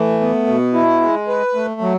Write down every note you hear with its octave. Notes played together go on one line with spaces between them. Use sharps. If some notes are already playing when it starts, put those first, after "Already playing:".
Already playing: E3 A3
B3
B2
E4
G#3
B4
A3
F#3